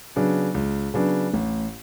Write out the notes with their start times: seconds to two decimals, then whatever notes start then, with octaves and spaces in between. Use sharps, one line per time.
0.16 C#3 F#3 B3 D4
0.54 C#2
0.94 C#3 F#3 B3 D4
1.34 A1